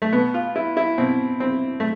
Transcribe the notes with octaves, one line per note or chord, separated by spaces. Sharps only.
A3
B2 B3
F4
E4
E4
B2 C4
C4
A3